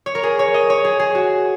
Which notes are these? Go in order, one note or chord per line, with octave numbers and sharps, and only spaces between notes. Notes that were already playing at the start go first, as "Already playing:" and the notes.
C#5
A#4
G#4
C#5
D#5
C#5
G#4
G#4
F#4